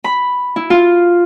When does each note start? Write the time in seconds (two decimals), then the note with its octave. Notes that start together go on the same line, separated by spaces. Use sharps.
0.04 B5
0.56 E4
0.70 F4